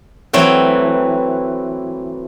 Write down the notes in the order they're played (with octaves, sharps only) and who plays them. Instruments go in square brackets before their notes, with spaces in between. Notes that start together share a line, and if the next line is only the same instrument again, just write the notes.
[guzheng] E3 F#3 A3 C4 G5